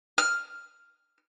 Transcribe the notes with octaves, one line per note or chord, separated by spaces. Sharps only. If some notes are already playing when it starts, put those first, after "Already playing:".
F6